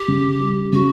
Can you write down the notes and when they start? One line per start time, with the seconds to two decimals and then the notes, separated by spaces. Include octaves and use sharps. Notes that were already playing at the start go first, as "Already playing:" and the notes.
Already playing: G4
0.08 C#3
0.40 G3
0.73 C#3 F#4